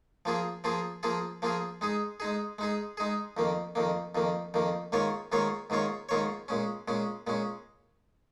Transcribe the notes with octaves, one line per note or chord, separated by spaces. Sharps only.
F3 A#3 F4 G#4
F3 A#3 F4 G#4
F3 A#3 F4 G#4
F3 A#3 F4 G#4
G#3 D#4 G#4
G#3 D#4 G#4
G#3 D#4 G#4
G#3 D#4 G#4
F2 D#3 A#3
F2 D#3 A#3
F2 D#3 A#3
F2 D#3 A#3
G#2 D#3 A#3 F4 C#5
G#2 D#3 A#3 F4 C#5
G#2 D#3 A#3 F4 C#5
G#2 D#3 A#3 F4 C#5
A#2 G#3 C#4
A#2 G#3 C#4
A#2 G#3 C#4